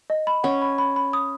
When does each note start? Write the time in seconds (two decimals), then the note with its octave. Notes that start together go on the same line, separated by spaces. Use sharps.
0.10 D#5
0.27 B5
0.44 C#4 F#5
0.62 B5
0.78 B5
0.96 B5
1.13 D#6